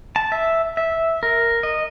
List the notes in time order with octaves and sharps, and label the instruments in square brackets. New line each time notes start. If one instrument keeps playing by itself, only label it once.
[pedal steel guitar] A5
E5
E5
A#4
D#5